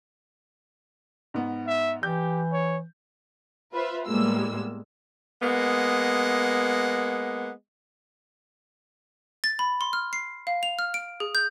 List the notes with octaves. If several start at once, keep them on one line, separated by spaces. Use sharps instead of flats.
G#2 B3
E5
E3 G4 G6
C#5
F4 B4 C5 E5
A2 G3 G#3 A#3 B3 E6
G#3 A#3 B3 F#5
A6
B5
C6
F6
C7
F5
F7
F6
D7
G#4
G6